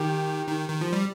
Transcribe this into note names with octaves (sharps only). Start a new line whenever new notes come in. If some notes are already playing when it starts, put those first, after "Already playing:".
Already playing: D#3 G4
D#3
D#3
F3
G3